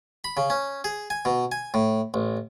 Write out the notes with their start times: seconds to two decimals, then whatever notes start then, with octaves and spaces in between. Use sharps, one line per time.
0.24 B5
0.37 C#3
0.50 C#4
0.84 G#4
1.10 G#5
1.25 B2
1.52 G#5
1.74 A2
2.14 A1